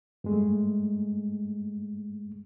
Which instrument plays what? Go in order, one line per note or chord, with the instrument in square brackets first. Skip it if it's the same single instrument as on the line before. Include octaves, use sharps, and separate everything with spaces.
[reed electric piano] G2 G#3 A3